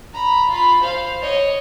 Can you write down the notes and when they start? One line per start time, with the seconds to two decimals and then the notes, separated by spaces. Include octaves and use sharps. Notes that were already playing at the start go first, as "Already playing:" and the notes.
0.13 A#5 B5
0.50 F4 B5
0.82 C5 F5
1.22 C#5 D#5